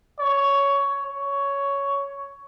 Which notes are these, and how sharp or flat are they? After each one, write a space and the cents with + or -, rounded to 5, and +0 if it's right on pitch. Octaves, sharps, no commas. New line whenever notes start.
C#5 +10
C#5 +10